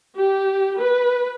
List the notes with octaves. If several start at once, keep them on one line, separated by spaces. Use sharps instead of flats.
G4
B4